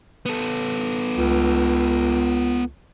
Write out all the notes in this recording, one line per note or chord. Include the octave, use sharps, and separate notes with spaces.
B3 A4
C#2